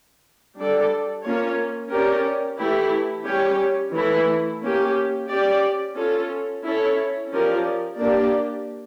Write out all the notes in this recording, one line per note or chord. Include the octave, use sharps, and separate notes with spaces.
G3 D4 A4 D5
A#3 C#4 F4 C#5
C#4 G4 A#4 D5
E3 A3 E4 G4
G3 C#4 G4 C#5
E3 A3 E4
A#3 C#4 G4
C#4 G4 D5
C#4 F4 A4
C#4 E4 A4 C#5
F3 C#4 G4 A#4 D5
A#3 D4 G4 D5